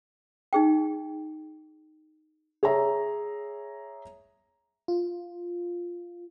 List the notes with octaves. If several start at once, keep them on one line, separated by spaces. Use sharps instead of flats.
D#4 G#4 G5
G#4 C#5 E5 A#5
F4